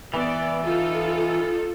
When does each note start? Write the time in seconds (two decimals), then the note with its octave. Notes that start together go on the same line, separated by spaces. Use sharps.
0.14 E3 B3 D5
0.64 D#4 F4 A4